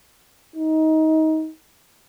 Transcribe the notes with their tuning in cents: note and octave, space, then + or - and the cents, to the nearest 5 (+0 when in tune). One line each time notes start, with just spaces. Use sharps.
D#4 +20